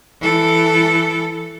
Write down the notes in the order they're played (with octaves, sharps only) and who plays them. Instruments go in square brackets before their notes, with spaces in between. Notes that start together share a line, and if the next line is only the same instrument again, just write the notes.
[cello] E3 A4